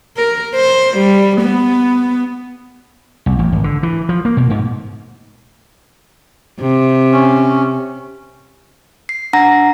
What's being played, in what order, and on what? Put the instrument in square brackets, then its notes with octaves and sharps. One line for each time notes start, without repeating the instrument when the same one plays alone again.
[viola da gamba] A#4
C5
G3
B3
[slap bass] C2
A1
G#1
D3
E3
F3
A#3
B2
G#2
[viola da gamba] C3
[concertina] C#4
[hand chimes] C7
D4 F#5 A#5 A#6